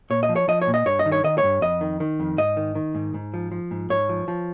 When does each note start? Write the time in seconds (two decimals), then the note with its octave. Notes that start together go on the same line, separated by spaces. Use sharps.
0.10 A#2 C#5
0.23 D#5
0.29 F3
0.36 C#5
0.48 F3 D#5
0.62 C#5
0.67 A#2
0.74 D#5
0.86 G2 C#5
0.99 D#5
1.06 D#3
1.12 C#5
1.24 D#3 D#5
1.38 C#5
1.43 G2
1.61 F2 D#5
1.81 D#3
2.00 D#3
2.20 F2
2.37 G#2 D#5
2.57 D#3
2.75 D#3
2.95 G#2
3.14 G#2
3.34 F3
3.52 F3
3.71 G#2
3.90 G#2 C#5
4.09 F3
4.28 F3